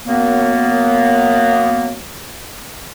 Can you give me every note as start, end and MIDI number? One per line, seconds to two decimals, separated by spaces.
0.06 1.97 42
0.06 1.97 58
0.06 1.97 59